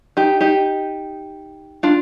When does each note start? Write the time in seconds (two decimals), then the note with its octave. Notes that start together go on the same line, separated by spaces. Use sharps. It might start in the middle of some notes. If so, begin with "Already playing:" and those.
0.17 D#4 G4
0.41 D#4 G4
1.83 D4 F4